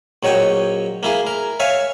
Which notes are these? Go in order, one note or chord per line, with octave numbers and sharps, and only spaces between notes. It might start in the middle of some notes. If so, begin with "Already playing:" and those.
A#1 F#3 C#5 D#5 G5
A#3 E4 G#4
A#4
C#5 E5 F5 G#5